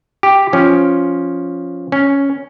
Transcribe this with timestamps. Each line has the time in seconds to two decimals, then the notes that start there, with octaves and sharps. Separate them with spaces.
0.23 G4
0.53 F3 C#4
1.92 C#4